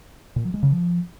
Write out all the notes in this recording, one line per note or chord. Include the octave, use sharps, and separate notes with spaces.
A#2
F#3
G#3
C#3
F3